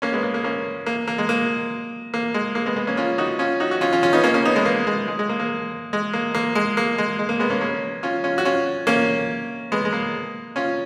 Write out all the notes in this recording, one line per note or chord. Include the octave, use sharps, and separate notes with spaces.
A#3 C#4
G#3 B3
A#3
A#3
A#3 C#4
A#3
A#3
G#3
A#3
A#3
G#3
A#3
G#3 B3
G#3 B3
A#3 C#4
C#4 F4
D#4 F#4
C#4 F4
D#4 F#4
F#4
C#4 F4
C#4 F4
C#4 F4
B3 D#4
A#3 C#4
A#3 C#4
B3 D#4
G#3 B3
A#3
G#3
G#3
G#3
A#3
A#3
G#3
A#3
A#3
G#3
A#3
G#3
G#3
A#3
G#3 B3
A#3 C#4
A#3 C#4
C#4 F4
C#4 F4
F#4
C#4 F4
A#3 C#4
G#3 B3
G#3
A#3
C#4 F4